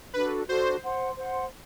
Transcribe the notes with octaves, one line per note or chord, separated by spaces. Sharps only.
D4 F#4 A4 B4
D4 F#4 A4 C5
C5 F#5 C6
C5 F#5 C6